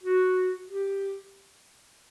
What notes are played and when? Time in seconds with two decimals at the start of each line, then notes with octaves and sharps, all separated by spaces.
0.03 F#4
0.70 G4